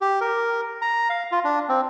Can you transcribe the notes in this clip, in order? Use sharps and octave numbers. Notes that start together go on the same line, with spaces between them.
G4
A#4
A#5
F5
F4
D4
C4